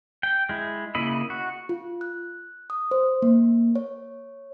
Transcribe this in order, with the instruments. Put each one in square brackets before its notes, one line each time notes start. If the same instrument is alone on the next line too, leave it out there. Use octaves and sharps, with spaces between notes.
[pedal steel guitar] G5
G#3 E4
C#3 A#3 E4 D#5 B5
F#4
[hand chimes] F4
F#6
D#6
C5
A#3
C#5